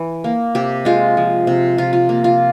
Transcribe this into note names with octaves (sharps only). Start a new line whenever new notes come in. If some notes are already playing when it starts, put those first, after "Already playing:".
Already playing: E3
A#3
C3 G4
G#3 F4
F3
C3
C3 F4
F4
A#3
F4